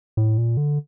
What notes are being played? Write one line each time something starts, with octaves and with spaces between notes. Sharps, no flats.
A2
A#2
D3